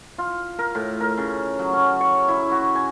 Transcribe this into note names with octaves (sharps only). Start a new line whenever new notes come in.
F4
A#4
A2
A#4
C#3
F#3
C#4
C#6
E4
F#4
G#5